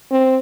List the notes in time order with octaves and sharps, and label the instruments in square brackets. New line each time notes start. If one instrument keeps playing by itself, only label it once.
[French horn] C4